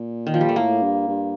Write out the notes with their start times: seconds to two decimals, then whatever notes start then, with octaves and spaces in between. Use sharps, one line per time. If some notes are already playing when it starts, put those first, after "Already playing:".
Already playing: A#2
0.27 D#3
0.34 F3
0.41 G3
0.49 A3
0.56 A2 A#3
0.83 G2
1.08 G2